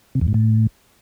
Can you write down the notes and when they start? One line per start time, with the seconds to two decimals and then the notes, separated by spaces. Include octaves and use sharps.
0.15 C3
0.21 E2
0.28 G#2
0.34 A2